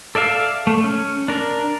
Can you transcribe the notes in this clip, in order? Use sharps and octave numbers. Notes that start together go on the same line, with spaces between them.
A4 D5 E5 F5
A3
C#4
D4 A#4